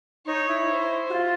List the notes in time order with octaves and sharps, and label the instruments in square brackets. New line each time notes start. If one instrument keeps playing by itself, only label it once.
[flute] D#4 [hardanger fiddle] C#5
[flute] E4
[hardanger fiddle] C5
[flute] F#4
F4